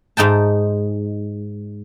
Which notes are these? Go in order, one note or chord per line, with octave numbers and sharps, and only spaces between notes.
G#2 D#4 G5 A5